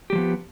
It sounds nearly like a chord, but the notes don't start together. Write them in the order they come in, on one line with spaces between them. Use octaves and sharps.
G4 G3 F3 B3